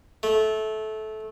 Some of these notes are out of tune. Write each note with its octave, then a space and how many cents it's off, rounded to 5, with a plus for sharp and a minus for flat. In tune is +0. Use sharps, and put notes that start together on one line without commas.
A3 -20